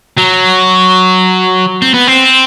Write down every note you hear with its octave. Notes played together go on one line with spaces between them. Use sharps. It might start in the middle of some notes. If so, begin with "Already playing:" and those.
F#3
C4
B3
C4